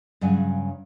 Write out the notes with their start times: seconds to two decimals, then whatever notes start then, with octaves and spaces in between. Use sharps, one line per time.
0.21 G2 C#3 F#3 F#5 G#5